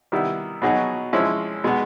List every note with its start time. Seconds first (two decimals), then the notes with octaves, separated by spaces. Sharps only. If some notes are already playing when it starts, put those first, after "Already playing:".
0.12 D#3 G3 B3 E4
0.62 B2 F#3 B3 D#4 G#4
1.13 F3 G#3 C#4 E4
1.64 B2 G#3 B3